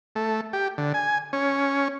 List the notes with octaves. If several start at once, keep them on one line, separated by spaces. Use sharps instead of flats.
A3
G4
D3
G#5
C#4